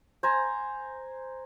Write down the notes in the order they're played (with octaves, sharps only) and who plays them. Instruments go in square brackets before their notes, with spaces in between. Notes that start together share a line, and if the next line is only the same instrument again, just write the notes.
[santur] C5 G#5 A#5